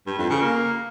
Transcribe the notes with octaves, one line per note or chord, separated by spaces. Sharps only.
G2
F2
C#3
A#3